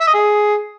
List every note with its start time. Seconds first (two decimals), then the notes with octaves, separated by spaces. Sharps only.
0.01 E5
0.08 D#5
0.14 G#4